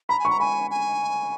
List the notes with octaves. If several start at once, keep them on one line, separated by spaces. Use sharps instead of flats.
A#5 B5
G#5
C#6
A#5
G#5 B5
G#5